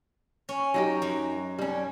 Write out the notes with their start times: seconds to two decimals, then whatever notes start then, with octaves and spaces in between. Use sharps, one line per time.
0.49 C#4
0.74 F#3 D#4 G4
1.02 F#2
1.59 G3 C#4